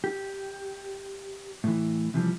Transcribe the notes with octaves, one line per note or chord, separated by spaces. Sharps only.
G4
A2 E3
C3 E3 F3 G3